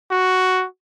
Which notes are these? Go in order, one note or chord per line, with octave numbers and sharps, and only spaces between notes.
F#4